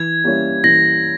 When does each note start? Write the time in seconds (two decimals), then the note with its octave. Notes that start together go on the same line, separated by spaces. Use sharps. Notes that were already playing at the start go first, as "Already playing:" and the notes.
Already playing: E3 G#6
0.24 G3 A#3 C#4 E4
0.64 E3 A#6